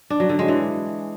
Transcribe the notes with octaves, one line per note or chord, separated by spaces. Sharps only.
D4
F#3
D3
G#3
E3